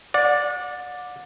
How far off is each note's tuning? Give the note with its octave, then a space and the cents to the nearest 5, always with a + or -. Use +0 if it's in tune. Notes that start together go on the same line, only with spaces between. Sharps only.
D5 +0 F#5 -35